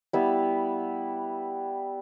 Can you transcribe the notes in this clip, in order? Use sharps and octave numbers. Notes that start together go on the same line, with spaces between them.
G3 B3 E4